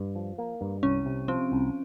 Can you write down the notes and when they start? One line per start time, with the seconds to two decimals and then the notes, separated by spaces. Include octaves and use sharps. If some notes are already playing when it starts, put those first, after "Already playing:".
Already playing: G2
0.16 F3
0.38 A#3
0.61 G2
0.83 C2 C#4
1.06 C3
1.28 F3 C4
1.52 C2